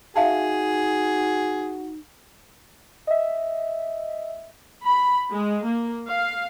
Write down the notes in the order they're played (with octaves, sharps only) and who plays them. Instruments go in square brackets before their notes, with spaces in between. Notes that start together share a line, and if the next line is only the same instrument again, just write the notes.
[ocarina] D#4 [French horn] F#4 [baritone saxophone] G#4 [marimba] E5 F5 A5
[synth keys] D#5 E5
[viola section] B5
G#3
A#3
F5